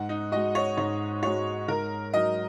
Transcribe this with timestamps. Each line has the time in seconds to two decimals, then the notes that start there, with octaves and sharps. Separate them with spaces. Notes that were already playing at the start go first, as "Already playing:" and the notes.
Already playing: G#2 F#5
0.09 D#4
0.32 G#3 F#4 D#5
0.55 C#5
0.77 G#2 C#5
1.23 G#3 F#4 C#5
1.68 G#2 A#4
2.14 F#3 D#4 D#5